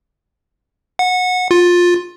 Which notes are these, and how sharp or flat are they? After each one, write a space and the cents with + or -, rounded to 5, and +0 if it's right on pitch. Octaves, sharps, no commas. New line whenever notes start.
F#5 -20
F4 +15